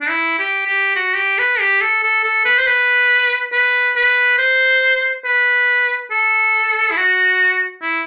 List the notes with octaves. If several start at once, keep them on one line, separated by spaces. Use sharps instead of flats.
D4
E4
G4
G4
F#4
G4
B4
G4
A4
A4
A4
B4
C5
B4
B4
B4
C5
B4
A4
E4
F#4
E4